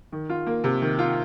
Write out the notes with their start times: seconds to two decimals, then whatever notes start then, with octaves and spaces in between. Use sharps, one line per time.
0.12 D#3
0.30 F4
0.47 A#3
0.64 C3
0.82 D#3
0.99 F4